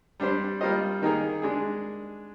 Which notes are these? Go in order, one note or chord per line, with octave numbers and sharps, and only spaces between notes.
G3 D4 G4 C5
G3 A#3 F4 C5 D#5
D#3 A#3 D#4 G#4
G#3 D4 G#4